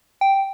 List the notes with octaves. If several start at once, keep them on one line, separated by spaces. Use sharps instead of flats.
G5